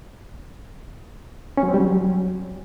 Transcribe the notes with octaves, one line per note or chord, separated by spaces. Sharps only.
C#4
F#3
C4
G3
F#3